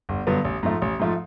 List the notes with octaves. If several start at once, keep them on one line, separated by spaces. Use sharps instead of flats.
G1
G2 D3 F#3 B3
A1
G#2 F3 A3
A1
G#2 F3 A3